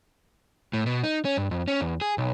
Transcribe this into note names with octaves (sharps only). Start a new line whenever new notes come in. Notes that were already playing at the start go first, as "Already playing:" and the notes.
A2
B2
D#4
C#4
G2
F2
C#4
E2
G#4
B1